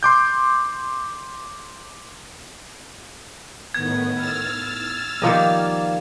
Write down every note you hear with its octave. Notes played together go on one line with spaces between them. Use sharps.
C6 D6 G6
A2 D#3 B3 G#6
E6 F6 A6
D#3 F3 G3 A#3 D#5 F5